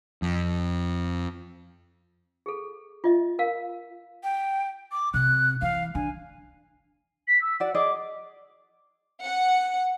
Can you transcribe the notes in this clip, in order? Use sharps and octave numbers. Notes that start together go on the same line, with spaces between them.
F2
G#4 A4
F4 D#5 E5
A#4 F5
G5
D6
C3 F#6
E3 F5
D3 G#5
B6
E6
F#4 D5 F#5
G#4 D5 D#5 D6
F#5